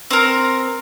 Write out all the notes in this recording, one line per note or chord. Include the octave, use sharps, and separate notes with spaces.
C4 A#4